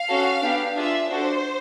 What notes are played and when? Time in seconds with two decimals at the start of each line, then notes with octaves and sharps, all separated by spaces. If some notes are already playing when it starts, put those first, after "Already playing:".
Already playing: F5
0.08 C#4 F#4 A4
0.42 B3 D4 G4
0.76 D4 F4 G#4 E5
1.10 D4 F#4 A4 C5